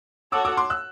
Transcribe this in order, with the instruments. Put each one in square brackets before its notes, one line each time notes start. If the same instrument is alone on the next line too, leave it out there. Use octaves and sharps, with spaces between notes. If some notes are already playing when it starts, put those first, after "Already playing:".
[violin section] F#4 A4 C#5 F#5 [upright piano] D6 E6
[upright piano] D6 E6
C6 D6
E6 F#6